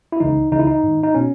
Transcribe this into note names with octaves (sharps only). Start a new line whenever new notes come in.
E4
C#2 C#3 E3 D#4
C#2 C#3 E3 D#4
E4
D#4
G#2 D#3
D#4
B2 C#4